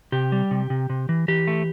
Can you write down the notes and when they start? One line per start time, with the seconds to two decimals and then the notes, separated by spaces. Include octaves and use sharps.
0.12 C3 G4
0.32 G3
0.51 C3
0.70 C3
0.90 C3
1.09 E3
1.28 E3 G4
1.48 A3